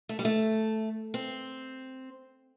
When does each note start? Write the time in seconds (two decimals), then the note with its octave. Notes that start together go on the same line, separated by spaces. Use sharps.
0.09 A3
0.19 G3
0.25 A3
1.14 C4